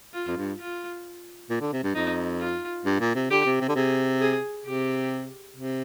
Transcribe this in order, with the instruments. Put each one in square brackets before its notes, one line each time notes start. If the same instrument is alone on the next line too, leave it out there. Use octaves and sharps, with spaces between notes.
[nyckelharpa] F4
[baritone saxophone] F2
G2
[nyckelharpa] F4
[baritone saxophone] A#2
D3
C3
G2
[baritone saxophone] F2 [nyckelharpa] D#4
[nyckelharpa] F4
[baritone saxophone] G2
A#2
C3
[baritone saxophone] D3 [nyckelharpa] G4
[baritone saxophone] C3
C3
D3
[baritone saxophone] C3 [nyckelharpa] G#4
[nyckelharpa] G#4
[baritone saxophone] C3 [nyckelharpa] G4
[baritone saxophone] C3